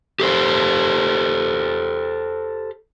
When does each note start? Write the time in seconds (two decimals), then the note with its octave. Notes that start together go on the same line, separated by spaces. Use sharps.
0.20 G4 A4 C5